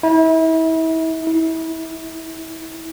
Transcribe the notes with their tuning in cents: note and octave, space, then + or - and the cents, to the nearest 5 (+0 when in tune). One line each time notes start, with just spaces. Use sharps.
E4 -35
E4 -30